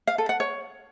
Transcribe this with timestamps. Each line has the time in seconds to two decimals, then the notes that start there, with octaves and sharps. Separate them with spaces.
0.07 F5
0.18 A4
0.29 F#5
0.40 C#5